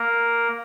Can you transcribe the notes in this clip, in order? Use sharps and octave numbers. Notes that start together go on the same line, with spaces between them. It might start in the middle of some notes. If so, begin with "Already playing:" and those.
Already playing: A#3 A#4